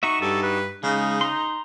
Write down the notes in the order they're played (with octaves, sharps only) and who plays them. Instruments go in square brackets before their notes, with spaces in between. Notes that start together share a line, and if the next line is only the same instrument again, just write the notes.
[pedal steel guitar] D#4 F#4 E5 [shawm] C#6
[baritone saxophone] G2 [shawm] A4
[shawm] B4
[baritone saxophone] C#3 [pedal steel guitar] G#3 [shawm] D#4
[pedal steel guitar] A#5 C6